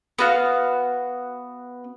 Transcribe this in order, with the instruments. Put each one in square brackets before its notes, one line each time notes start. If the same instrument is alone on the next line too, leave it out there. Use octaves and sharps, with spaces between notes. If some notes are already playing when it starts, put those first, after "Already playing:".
[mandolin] B3 F#4 F5